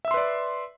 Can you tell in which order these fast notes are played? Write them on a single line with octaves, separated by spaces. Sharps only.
E5 E6 C6 B4 D5